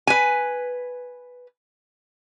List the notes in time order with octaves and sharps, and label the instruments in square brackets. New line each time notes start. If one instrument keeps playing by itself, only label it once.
[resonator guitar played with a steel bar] B4 G#5